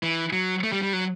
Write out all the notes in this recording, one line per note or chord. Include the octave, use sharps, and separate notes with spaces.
E3
F#3
A3
G3
G3
F#3